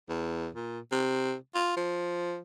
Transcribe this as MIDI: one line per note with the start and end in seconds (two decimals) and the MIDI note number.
0.09 0.48 40
0.55 0.80 46
0.92 1.35 48
1.55 1.73 65
1.77 2.39 53